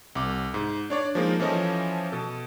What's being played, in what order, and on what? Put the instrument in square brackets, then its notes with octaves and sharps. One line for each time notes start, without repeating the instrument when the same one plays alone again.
[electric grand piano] C2 D6
G#2
D4 C#5 D5
F3 G#3 A#3 D#4
E3 F3 C#4 A4 D#5
B2 A4